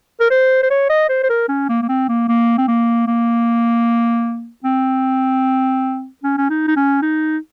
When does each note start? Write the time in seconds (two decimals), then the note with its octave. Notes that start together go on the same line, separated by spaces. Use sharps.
0.20 A#4
0.31 C5
0.63 C5
0.71 C#5
0.90 D#5
1.09 C5
1.24 C5
1.30 A#4
1.49 C#4
1.69 A#3
1.82 A#3
1.89 C4
2.08 A#3
2.29 A#3
2.58 C4
2.68 A#3
3.07 A#3
4.65 C4
6.24 C#4
6.38 C#4
6.50 D#4
6.68 D#4
6.76 C#4
7.02 D#4